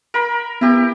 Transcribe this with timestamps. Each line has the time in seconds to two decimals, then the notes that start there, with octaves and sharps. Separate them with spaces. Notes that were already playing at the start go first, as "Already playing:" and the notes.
0.14 A#4 B5
0.61 B3 E4 G4